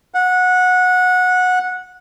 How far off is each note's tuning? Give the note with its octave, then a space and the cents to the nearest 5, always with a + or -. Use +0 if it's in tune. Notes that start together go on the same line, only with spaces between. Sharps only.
F#5 -20